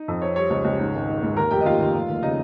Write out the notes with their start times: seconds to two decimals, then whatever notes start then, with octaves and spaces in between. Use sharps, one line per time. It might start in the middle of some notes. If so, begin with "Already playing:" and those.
Already playing: D#4 D#5
0.08 F2
0.22 C4 C#5
0.36 G3 C#5
0.50 C#2 C#5
0.65 C#2
0.79 G#2
0.95 G#1
1.08 G#2
1.23 G#2
1.37 D#2 A#4 A#5
1.51 F1 G4 G5
1.61 D#5
1.65 D#2 F4 F5
1.80 D#2
1.95 F1
2.09 D#2
2.22 C#3 D#4 D#5